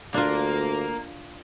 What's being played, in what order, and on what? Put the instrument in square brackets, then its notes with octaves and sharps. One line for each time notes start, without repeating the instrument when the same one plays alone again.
[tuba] D2 [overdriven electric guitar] A#3 [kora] D4 F4